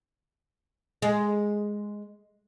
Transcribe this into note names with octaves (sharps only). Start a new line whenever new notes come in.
G#3